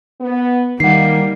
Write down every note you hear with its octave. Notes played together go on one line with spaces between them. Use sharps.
B3
D#3 G3 A#3 D#4 F#5 C7